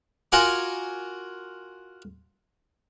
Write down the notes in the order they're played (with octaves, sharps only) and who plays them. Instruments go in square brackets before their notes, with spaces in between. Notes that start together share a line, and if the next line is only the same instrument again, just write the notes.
[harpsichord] F4 F#4 A#4 F#5 G#5 D6